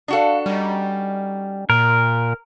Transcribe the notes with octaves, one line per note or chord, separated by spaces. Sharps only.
D4 F#4 A4 F5 B5 D#6
G3 C#4 D#4
A#2 A#4